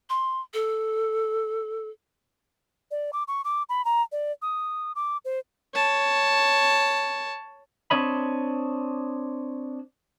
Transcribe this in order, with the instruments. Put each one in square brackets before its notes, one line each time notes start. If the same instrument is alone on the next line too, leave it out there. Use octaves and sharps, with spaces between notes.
[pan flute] C6
A4
[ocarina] D5
D6
C#6
D6
B5
A#5
D5
D#6
D6
C5
[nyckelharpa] C#5 A5
[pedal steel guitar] C4 D4 C#5 D#5 B5